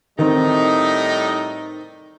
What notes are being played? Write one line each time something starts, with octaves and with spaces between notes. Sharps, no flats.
A2 D#3 G3 C4 D#4